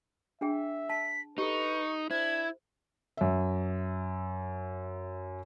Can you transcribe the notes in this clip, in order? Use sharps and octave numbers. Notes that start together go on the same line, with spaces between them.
D4 G#4 E5 G5
A5 B6
D#4 G4 A4 B4 C#6
D4 E4 C5 G#6
F#2 E5